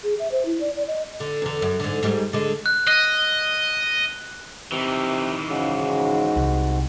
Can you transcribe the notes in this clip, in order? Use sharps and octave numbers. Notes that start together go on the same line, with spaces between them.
G#4
E5
C5
E4
D5
D5
D#5
D3
E2 D3
F#2
G#2 D3
G#2 G3
D3 G#3
F#6
D#5 F#6
C3 D#3 E3
G#2 C#3 G#3 F#4
C2